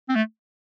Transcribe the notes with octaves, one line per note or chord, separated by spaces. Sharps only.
C4
A3